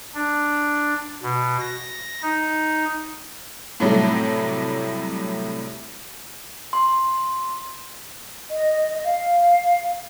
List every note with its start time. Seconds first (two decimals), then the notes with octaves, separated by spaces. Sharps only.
0.14 D4
1.23 B2
1.60 A#6
2.22 D#4
3.80 A2 C3 F#3 G3 A3
6.73 C6
8.50 D#5
9.03 F5